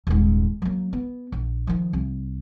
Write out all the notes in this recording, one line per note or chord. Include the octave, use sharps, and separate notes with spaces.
D#1 G#2
F#3 A#3
B3
A#1
D#3 F3
C2